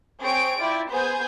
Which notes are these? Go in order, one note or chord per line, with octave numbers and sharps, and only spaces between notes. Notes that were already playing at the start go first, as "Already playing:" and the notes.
C4 G#4 C#5 G5 D7
E4 F4 D5 G5
B3 G#4 C5 G#5 G6